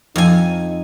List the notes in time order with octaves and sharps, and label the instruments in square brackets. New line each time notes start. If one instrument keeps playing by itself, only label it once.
[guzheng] F2 G#5 [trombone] D#4